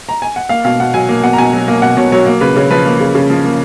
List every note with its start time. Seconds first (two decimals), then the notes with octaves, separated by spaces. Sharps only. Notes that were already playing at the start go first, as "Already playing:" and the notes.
0.09 A#5
0.22 G#5
0.36 F#5
0.49 A#3 F5
0.65 B2 F5
0.80 B2 F#5
0.94 F#3 G#5
1.09 A#3
1.24 B2 F#5
1.33 A#5
1.38 B2 G#5
1.53 F#3
1.68 A#3
1.82 B2 F#5
1.97 B2 C#5
2.12 F#3 C#5
2.26 A#3
2.41 C#3 B4
2.56 C#3 C#5
2.71 F3 B4
2.85 A#3
3.00 C#3
3.15 C#3
3.30 F3
3.44 A#3